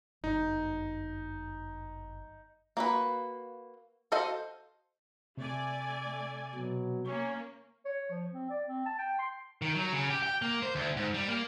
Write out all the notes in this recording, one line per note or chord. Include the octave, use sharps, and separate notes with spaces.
G1 F#2 D#4
A#3 F#4 B4
F#4 A4 C5 D#5 F5
C3 A3 D5 G#5
B2 F#3
A#3 C#4 C#5
C#5
F3
C4
D5
C4
A5
G5
C6
D#3
F#3
C#3
G4
G5
A#3
C5
D2
G#2
G3
A#3